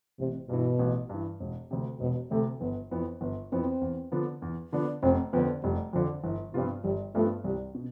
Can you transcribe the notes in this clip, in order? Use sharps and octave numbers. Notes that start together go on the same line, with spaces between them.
A1 C3
G2 B2 E3
A1
G2 E3
E1
D2 C3
E1 B2
D2 C3 A3
G1 B3
F2 E3 B3
G1 B3
F2 E3 B3 C4
E2
D3 F3 B3 D4
E2
D3 F3 B3 D4
F1 C4
F2 D3 B3
F1 G3
F2 D3 F3
G1 E3
G2 C3 F3 B3 F4
G1 G3
G2 F3 A3 B3 F4
C2 G3
B2